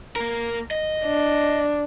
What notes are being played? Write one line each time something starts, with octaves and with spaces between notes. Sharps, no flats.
A#3 A#4
D#5
D4